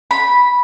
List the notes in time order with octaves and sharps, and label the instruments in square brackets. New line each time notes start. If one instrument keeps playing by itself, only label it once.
[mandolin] B5